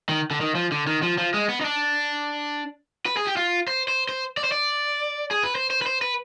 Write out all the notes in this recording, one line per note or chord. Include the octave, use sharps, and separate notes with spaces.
D#3
D3
D#3
F3
D3
D#3
F3
F3
G#3
B3
D#4
D4
B4
G#4
G4
F4
C5
C5
C5
D5
C5
D5
G#4
B4
C5
C5
B4
C5
B4